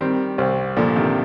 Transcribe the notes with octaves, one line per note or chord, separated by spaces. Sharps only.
D#3 G3 C4
C2
A#2 D3 F3
C3 D#3